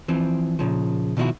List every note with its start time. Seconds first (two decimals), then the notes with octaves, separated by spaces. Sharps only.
0.08 E3 F3 C4
0.59 A#2 C#3 F3
1.17 B2 D#3 F3 D#4 E4 F#4